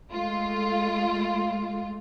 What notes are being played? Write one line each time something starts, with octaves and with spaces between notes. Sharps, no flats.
G#3 A3 F4